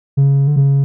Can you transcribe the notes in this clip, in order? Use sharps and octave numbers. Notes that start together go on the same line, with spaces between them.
C#3
D3
C#3